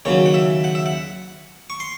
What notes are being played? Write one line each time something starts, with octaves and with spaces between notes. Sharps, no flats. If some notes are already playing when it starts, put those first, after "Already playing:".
D#2 C#3 F#3 C#5
F#5
E5
F#5
E5
F#5
C#6
C6